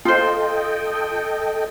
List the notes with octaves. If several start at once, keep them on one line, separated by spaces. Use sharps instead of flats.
F4 A4 C5 D#5 G5